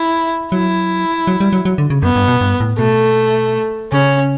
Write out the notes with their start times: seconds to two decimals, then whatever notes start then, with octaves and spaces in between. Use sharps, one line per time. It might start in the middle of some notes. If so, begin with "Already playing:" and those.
Already playing: E4
0.52 F#3 E4
1.27 F#3
1.40 G3
1.53 F#3
1.65 F#3
1.78 D3
1.90 C#3
2.03 F#2 B3
2.16 G2
2.28 B2
2.41 G2
2.60 A2
2.79 B2 A3
3.92 C#3 C#4